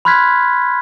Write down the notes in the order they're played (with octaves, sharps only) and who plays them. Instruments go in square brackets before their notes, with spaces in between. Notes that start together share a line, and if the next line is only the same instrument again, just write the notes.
[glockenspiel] B5 C6 F6 F#6 G#6 B6